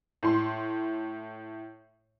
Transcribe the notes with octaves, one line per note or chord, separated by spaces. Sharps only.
A2 C6